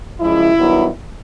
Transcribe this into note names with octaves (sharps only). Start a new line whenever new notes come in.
F#2 C#3 F3 G#3 E4
G2 D#3 F#3 B3